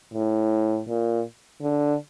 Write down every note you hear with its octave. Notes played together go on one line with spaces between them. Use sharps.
A2
A#2
D3